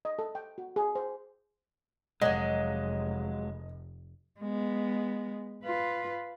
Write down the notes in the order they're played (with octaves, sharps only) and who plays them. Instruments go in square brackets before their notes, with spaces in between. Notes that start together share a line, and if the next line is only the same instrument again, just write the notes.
[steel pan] D#5
A4
G5
F#4
G#4
C5
[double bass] F1 [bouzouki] F#3 A#3 [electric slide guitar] G#3 [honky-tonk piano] D#5
[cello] G#3 B3
F4 B4